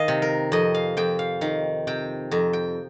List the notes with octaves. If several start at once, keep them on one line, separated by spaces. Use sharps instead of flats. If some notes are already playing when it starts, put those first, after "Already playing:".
Already playing: D#3 D#5 F5
C3
A#4
F2 D#5
F5
F2 G5
F5
D#3 F5
C3 G5
F2 A#5
G5